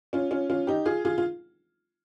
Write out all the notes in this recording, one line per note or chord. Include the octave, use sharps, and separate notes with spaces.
C#4 F4
C#4 F4
C#4 F4
D#4 G4
F4 G#4
F4 G#4
F4